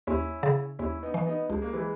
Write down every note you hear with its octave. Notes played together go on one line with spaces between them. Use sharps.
D#2 C#4 E4
C#3
D#2 C#4 E4
B3 D#4
E3
B3 D#4
C#2 G#3
A#3
E3 G#3